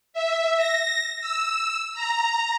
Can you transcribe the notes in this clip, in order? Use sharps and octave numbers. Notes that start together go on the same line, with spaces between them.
E5
A#6
E6
A#5